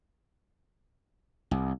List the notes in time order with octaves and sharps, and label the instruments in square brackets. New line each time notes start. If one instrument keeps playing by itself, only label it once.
[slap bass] C2